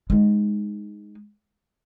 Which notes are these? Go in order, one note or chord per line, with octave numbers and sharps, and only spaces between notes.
G#3 D#4